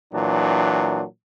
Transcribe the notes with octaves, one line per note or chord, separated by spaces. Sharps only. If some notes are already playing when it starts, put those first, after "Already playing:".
A#2 E3 F#3 D4